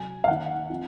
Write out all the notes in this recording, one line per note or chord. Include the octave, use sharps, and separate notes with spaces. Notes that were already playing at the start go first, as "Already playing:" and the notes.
Already playing: C3 F#3 C4 G#5
F5
D#3 A#3 D#4 F#5
F3 C4 D#4